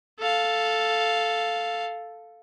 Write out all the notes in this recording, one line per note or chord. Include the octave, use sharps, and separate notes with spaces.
A4 F5